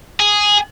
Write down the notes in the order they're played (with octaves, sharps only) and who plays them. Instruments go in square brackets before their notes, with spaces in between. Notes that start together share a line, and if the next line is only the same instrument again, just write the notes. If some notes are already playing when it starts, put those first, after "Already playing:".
[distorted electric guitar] G#4